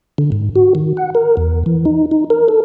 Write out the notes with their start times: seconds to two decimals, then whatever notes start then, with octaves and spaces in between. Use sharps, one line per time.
0.18 D3
0.32 G#2
0.56 F#4
0.75 D#3
0.97 F#5
1.15 A#4
1.37 E2
1.66 E3
1.85 D#4
2.11 D#4
2.30 A#4
2.48 A4